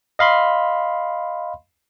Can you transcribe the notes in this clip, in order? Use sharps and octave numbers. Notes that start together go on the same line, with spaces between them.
D#5 F5 B5 C6